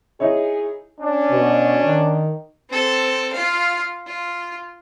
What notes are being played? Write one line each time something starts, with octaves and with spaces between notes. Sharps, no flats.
D#4 E4 G#4 C#5
C#4 D4
B2
D#3
C4 A4
F4 F5
F4